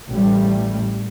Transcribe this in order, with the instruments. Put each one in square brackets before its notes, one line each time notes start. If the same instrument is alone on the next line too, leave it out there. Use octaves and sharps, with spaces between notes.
[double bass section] A1 G3 A3